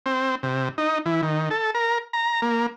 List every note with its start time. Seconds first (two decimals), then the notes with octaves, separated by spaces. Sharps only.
0.06 C4
0.43 C3
0.78 D#4
1.06 E3
1.23 D#3
1.50 A4
1.75 A#4
2.13 A#5
2.42 A#3